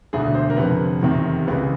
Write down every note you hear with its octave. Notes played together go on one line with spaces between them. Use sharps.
E1 D2 D3 G#4
C5
A#4
F1 F2 D3 B4
F1 E2 C3 D#3
C#2 C#3 E3 B4